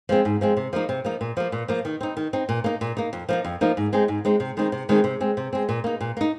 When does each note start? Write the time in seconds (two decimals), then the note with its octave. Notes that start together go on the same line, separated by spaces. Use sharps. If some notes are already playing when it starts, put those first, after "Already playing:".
0.09 F3 G#3 C4
0.25 G#2
0.41 F3 G#3 C4
0.57 C3
0.73 F3 A#3 D#4
0.89 C3
1.05 F3 A#3 D#4
1.21 A#2
1.37 F3 A#3
1.52 A#2
1.68 F3 A#3
1.85 D#3
2.01 C4 D#4
2.17 D#3
2.33 C4 D#4
2.49 A#2
2.64 A#3 D#4
2.81 A#2
2.97 A#3 D#4
3.13 F2
3.29 F3 A#3 D#4
3.45 F2
3.61 F3 A#3 D#4
3.77 G#2
3.93 G#3 C4 D#4
4.08 G#2
4.25 G#3 C4 D#4
4.40 C3
4.57 D#3 G#3 C4 D#4
4.72 C3
4.89 D#3 G#3 C4 D#4
5.04 C3
5.21 G#3 C4
5.37 C3
5.53 G#3 C4
5.69 A#2
5.84 A#3 D#4
6.01 A#2
6.17 A#3 D#4